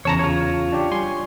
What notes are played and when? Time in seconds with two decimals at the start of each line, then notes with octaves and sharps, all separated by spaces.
0.05 E2 C#3 C#5 A5 A#5
0.19 F4 C#5
0.73 D4 G4
0.92 G3 G#5 C6